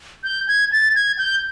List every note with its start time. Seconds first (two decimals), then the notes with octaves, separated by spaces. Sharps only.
0.24 G6
0.48 G#6
0.72 A6
0.96 G#6
1.19 G6